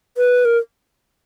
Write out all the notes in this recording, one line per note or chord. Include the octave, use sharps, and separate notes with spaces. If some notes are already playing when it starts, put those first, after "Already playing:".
B4
A#4